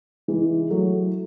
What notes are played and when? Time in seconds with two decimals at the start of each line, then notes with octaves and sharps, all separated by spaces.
0.28 E3 G#3
0.70 F#3 A3